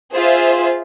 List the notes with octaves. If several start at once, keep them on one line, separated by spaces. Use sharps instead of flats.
F4 G#4 C5 E5